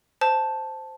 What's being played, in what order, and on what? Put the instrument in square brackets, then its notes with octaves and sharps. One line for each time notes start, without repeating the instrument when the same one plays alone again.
[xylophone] C5 A5